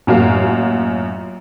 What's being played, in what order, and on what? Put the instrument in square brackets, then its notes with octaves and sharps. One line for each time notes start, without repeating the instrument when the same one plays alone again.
[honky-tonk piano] A1 F#2 A#2 F#4 F5